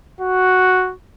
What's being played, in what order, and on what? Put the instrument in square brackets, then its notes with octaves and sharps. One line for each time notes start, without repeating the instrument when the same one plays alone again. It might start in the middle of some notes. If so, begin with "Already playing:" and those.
[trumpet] F#4